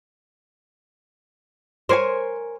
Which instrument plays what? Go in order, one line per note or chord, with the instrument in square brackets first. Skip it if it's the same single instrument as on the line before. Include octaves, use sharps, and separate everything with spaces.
[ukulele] A#4 C#5 G#5 [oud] C5